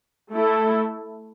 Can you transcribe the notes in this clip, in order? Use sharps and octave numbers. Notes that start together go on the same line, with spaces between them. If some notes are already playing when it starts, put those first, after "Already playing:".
A3 E4 A4